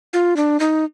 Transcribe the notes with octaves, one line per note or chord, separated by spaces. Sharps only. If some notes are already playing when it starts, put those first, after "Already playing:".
F4
D4
D#4